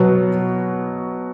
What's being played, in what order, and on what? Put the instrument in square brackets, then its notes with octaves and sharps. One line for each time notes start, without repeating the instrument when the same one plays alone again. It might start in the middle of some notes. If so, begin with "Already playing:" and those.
Already playing: [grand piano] B2 F#3 B3